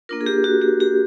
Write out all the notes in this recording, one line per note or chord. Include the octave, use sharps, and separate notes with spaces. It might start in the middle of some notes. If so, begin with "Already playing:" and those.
A#3 D4 F4 A#4
G#4
G4
F#4
G4
G4